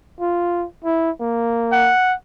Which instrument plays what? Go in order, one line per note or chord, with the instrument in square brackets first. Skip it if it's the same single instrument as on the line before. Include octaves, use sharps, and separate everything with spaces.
[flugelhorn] F4
E4
A#3
[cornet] F#5